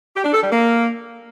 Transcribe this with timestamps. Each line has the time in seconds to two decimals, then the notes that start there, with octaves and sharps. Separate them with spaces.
0.15 G4
0.24 D4
0.33 A4
0.42 G3
0.51 A#3